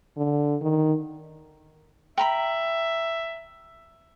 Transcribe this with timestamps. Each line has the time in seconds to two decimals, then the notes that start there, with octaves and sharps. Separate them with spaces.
0.17 D3
0.61 D#3
2.18 E5 G5 A#5 B5